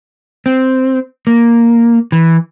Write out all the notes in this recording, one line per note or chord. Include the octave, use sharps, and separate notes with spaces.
C4
A#3
E3